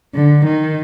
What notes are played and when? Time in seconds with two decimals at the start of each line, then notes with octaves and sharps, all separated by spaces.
0.15 D3
0.46 D#3